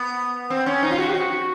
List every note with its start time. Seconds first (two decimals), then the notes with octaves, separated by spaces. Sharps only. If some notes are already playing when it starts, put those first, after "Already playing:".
Already playing: B3
0.50 C4
0.66 C#4
0.83 D#4
0.91 F4
0.98 F#4
1.09 G4
1.14 F#4